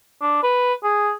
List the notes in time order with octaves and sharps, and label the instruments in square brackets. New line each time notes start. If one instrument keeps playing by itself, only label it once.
[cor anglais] D4
B4
G#4